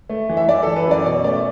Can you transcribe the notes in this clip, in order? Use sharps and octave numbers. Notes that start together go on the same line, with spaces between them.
A3
E3
E5
E3 D5
E3 A4
B4
F#2 D5
B2 D5
A3 D5